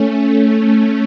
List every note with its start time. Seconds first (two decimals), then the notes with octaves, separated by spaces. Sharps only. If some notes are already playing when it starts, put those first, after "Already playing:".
Already playing: A3 C#4
0.35 A3 C#4